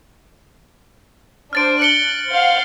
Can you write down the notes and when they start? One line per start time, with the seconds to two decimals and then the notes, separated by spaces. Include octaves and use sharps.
1.53 D4 C5 F6 A6 D7
1.82 F#6 C#7 F#7 G7
2.29 C5 F5 F#5